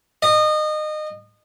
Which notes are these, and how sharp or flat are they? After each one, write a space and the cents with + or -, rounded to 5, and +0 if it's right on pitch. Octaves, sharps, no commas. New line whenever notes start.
D#5 -25